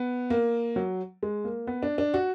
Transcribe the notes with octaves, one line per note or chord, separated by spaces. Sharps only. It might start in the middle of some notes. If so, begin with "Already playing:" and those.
Already playing: B3
A#3
F#3
G#3
A#3
B3
D4
D4
F#4